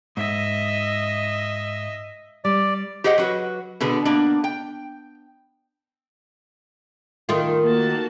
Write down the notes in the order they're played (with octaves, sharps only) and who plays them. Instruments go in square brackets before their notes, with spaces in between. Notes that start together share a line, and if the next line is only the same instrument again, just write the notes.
[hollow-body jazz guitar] G#2 [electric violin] D#5 E5
[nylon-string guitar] G3 [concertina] D5
[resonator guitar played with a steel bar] G4 G#4 C5 D#5 F#5
F#3 F#4 B4
B2 D3 G#4 B4
A#3 B3 D4
G5
[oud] D#3 A3 F4
[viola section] A#3 F#4 A5